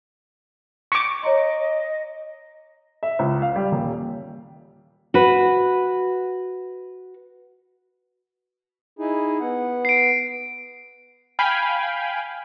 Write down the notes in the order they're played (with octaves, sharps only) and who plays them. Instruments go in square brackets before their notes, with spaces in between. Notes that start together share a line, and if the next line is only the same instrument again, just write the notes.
[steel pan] C#6 D6
[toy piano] C#5 A#5 C6 [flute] D#5
[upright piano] E5
C#2
F5
G3
D#1
[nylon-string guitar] F#4 B4
[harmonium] D#4 E4 G#4
B3 F#5
[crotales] C7 D7
[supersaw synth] F5 G5 G#5 B5